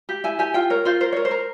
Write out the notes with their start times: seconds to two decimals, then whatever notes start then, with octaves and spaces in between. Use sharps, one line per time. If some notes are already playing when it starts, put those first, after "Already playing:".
0.09 G4
0.24 E4 G#5
0.39 G4 G#5
0.54 F4 G5
0.70 A#4 C#5
0.85 F4 C5
1.01 A#4 C5
1.12 A#4 C#5
1.25 C5
1.31 A#4